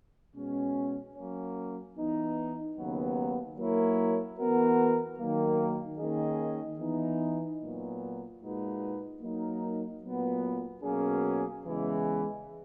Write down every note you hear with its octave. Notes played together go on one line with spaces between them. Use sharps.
B2 G#3 C#4
F#3 A#3 C#4
E3 B3 D#4
D#2 C#3 F#3 B3
F#3 A#3 E4 A#4 C#5
E3 B3 F#4 A#4
D#3 F#3 A#3
D#3 A#3 C#4 G#4 D#5
E3 B3 D#4
A#2 F#3 B3
A#2 G#3 D#4 F#4 B4
F#3 A#3 D#4 A#4
A#2 F#3 B3
B2 F#3 A#3 C#4 G#4
E2 C#3 E3 G#3